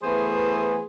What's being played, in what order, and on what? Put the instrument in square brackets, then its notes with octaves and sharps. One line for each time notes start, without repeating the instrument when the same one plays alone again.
[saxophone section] E3 A3 B3 G#4 C5